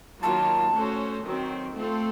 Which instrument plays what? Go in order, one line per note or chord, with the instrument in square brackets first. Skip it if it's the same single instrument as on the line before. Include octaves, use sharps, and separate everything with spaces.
[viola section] D#3 F#3 A#3 F4 [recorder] A5
[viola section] A3 C#4 F#4 A4 C5
D#3 F#3 C4
A3 C4 F4 A4